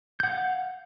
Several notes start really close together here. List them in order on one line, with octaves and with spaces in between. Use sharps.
G6 F#5 F5